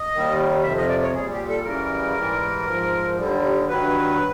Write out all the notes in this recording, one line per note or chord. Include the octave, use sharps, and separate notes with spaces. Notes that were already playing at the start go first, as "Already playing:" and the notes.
Already playing: D#5
D#2 D#3 G3
F2 C3 F3 E5
D#5
D5
C#5
A#2 G3 G#4
G4
A4
F#2 C#3 E3 G3 A#4
G#2 E3 G3
G#2 F3
D#2 D3 G3
G2 D#3 F#3 B4